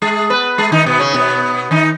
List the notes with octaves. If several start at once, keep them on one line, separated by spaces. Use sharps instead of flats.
G#3 G#4
B3 B4
G#3 G#4
D#3 D#4
B2 B3
C#3 C#4
B2 B3
D#3 D#4